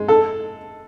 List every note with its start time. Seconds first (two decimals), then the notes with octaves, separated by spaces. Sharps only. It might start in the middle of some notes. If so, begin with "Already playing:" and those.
Already playing: G#3
0.08 A4